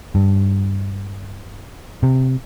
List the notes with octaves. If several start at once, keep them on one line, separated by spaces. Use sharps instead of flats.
G2
C3